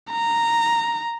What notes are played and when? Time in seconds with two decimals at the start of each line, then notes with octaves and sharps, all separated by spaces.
0.12 A#5